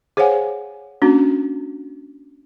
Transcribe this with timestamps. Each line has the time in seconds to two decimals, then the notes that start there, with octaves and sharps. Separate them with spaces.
0.17 G#4 C5 C#5 F5 F#5 G#5
1.02 A#3 C#4 D4 F#4